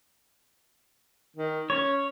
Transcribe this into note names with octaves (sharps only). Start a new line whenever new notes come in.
D#3
C#4 C#5